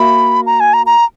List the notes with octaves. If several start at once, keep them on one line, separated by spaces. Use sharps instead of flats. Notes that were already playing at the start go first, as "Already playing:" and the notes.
Already playing: A#3 F#4 E5 B5
A#5
G#5
A#5
A#5